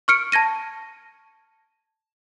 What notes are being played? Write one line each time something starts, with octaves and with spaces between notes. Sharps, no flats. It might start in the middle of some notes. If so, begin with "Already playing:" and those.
C#6 F6 C#7 D7
A5 G#6 A#6 D#7